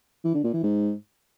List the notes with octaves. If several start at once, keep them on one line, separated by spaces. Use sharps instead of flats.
E3
D3
A#2
E3
G#2